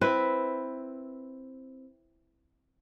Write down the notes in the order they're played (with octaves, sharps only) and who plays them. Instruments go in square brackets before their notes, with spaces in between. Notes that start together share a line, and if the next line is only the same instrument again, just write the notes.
[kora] C4 E4 B4